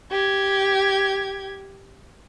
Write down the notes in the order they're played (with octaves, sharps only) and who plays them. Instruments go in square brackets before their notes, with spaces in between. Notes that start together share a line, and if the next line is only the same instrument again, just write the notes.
[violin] G4 G#6